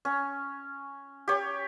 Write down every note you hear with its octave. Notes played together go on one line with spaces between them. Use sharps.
C#4
G4 C#5